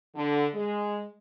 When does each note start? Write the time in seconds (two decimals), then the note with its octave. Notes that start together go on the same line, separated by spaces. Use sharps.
0.15 D3
0.54 G#3